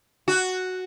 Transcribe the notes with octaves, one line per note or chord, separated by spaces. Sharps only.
F#4